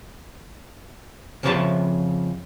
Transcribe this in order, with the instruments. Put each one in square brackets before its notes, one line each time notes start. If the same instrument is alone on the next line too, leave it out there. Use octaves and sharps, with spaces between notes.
[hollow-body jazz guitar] F2 C#3 F3 C#5 E5 A5